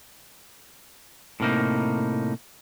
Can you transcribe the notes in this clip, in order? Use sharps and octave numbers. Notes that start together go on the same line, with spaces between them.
A2 C3 A#3 D#4